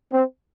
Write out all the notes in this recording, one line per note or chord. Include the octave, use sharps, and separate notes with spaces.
C4